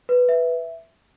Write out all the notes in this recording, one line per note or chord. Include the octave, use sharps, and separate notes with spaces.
B4
E5